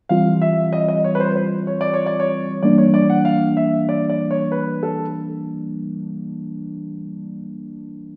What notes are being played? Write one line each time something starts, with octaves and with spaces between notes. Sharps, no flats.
E3 G3 C4 F4 F5
E5
D#5
D#5
C#5
B4
C5
C5
C#5
D5
C#5
D5
C#5
E3 G3 A#3 D4 D5
C#5
D5
F#5
F5
E5
D5
D5
C#5
B4
A4